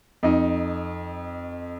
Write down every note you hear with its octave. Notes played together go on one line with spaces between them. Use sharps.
F2 D#4